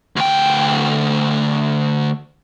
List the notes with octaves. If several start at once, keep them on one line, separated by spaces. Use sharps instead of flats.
D2 G5